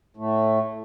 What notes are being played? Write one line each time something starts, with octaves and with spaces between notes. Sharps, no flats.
A2 A3